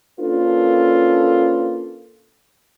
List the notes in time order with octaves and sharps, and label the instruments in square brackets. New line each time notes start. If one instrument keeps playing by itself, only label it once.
[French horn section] A#3 C#4 D4 F4 A4 B4